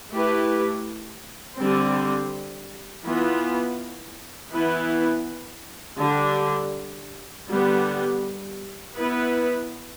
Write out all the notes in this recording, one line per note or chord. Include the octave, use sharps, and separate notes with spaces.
A3 E4 G4 B4
D3 G3 C4
E3 B3 F4
E3 B3 E4 B4
D3 G3 D4 G4
D3 G3 B3
B3 E4 B4